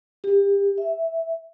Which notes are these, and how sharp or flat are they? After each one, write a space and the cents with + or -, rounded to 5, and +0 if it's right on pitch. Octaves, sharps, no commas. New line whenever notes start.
G4 +30
E5 -5